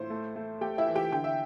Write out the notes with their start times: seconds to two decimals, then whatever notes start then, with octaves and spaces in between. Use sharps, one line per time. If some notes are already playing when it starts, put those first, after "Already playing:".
Already playing: A2 C5 C6
0.10 A3
0.36 A3
0.61 A3 G4 G5
0.78 E4 E5
0.87 E3
0.95 G4 G5
1.12 D3 G5
1.24 E5